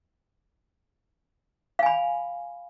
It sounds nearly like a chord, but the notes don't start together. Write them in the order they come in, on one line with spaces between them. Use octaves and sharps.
F5 G#5 B5